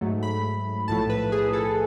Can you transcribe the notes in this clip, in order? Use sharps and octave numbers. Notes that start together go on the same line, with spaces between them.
G#2 F#3 A3
B5
B1 A2 F3 A3 A5
B4
G#4
A4